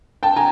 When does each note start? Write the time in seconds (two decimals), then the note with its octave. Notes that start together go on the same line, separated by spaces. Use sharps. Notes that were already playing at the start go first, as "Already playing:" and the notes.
0.23 G5 A5
0.36 G#5 A#5